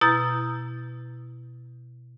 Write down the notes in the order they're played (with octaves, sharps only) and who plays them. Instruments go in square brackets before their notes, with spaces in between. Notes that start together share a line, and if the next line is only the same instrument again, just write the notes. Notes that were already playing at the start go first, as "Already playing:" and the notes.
[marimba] B2 E4 A#5 G6 A6